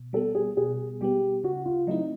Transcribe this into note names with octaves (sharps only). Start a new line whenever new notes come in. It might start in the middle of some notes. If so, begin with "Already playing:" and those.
Already playing: B2
G3 B3 A4
G#4
B2 G#4
G3 B3 G4
C#3 F#4
F4
F#3 A3 C4 D#4 E4